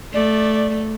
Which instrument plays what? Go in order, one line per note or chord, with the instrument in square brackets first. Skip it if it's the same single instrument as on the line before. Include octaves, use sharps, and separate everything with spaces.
[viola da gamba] A3 [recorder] D5